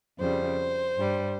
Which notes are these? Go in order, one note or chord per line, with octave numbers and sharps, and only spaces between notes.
F2 C#3 G3 C5
G2 G3